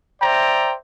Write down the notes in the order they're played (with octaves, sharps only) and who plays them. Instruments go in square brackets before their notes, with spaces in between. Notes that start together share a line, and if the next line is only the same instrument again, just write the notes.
[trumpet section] C5 D5 E5 G5 A#5